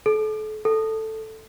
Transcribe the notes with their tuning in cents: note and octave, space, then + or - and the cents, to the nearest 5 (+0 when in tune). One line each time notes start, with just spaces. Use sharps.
A4 -35
A4 +5